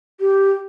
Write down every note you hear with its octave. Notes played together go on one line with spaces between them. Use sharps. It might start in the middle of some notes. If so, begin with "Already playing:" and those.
G4